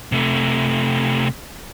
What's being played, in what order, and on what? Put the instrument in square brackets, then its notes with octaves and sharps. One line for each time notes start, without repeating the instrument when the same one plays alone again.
[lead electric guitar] C3 A3